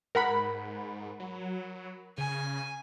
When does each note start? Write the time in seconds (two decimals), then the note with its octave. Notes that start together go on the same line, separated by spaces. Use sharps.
0.15 G#2 A#4 F#5 B5
1.20 F#3
2.18 C#3 G#5